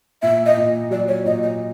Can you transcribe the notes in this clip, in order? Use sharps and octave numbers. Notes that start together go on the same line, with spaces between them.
A#2 E5
D#5
A#2
F#3 D5
C#5
A#2 D#5
D#5